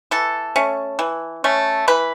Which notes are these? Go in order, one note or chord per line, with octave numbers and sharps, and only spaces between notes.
E3 A4
A3 C#4
E3
A3 C#4
E3 B4